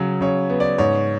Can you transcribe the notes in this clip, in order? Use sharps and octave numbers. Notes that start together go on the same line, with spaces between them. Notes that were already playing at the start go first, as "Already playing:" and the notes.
Already playing: C#3 F#3
C#3 C#5
B3
D5
G#2 C#5